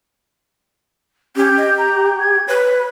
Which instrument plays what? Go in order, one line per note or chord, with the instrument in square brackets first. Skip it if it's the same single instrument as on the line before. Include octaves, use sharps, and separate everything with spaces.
[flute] C#4 [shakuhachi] G4
[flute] D#5
A#5
G#6
[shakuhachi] B4 [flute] C#5